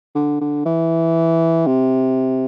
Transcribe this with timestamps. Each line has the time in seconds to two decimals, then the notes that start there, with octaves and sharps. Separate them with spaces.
0.15 D3
0.41 D3
0.66 E3
1.66 C3